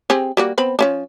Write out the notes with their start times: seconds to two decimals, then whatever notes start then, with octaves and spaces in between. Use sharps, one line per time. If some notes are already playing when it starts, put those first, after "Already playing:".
0.10 C4 G4 G#4
0.37 G3 A#3 F#4
0.58 B3 C4 B5
0.79 F3 C#4 D4